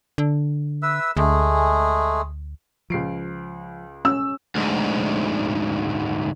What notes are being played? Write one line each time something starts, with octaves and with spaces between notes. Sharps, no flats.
D3
B4 E5 E6
D2 G#3 A3 G#4
C#2 F3 C7 D7
C#4 E6
D2 G#2